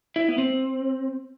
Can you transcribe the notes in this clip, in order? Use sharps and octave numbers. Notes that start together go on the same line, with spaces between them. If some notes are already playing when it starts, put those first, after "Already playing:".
E4
B3
C4